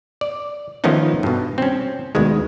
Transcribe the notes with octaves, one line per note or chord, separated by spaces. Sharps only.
D5
D#3 F3 A3 B3 C#4 D#4
G2 B2
C4 C#4
D2 B2 D#3 G#3